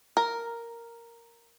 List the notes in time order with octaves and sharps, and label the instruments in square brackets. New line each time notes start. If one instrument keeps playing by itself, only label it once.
[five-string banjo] A#4